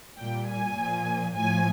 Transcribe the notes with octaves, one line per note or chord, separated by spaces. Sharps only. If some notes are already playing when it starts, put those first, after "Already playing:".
A#2 G3 G5
G#5
A#2 F3
A2 F3 G#5